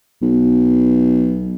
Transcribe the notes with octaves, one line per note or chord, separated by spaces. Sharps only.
B1